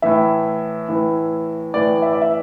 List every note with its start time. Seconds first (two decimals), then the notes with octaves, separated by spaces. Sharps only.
0.02 A2 E3 E5
0.89 A2 E3
1.74 A2 E3 D5
2.02 E5
2.13 D5
2.22 E5